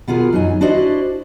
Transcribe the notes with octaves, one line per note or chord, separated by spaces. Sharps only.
B2 B3 F4 G#4 A#4
F#2 F#3 D#4 G#5
D4 E4 F#4 C5 D5 D#5